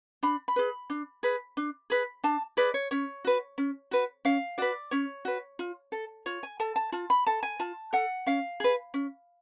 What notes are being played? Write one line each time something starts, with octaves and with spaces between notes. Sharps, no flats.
D4 B5
B5
G#4 B4
D4
G#4 B4
D4
G#4 B4
D4 A5
G#4 B4 D5
C#5
C#4 C#5
F#4 B4
C#4
F#4 B4
C#4 F5
F#4 B4 D5
C#4 C#5
F#4 B4
F4
A4
F4 C#5
G#5
A4 A5
A5
F4 A5
B5
A4 A5
G#5
F4 A5
A4 F#5
C#4 F5
G#4 B4
C#4